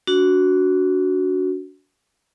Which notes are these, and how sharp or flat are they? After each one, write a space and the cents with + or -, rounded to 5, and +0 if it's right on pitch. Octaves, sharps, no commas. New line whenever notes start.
D4 -30 F#4 +0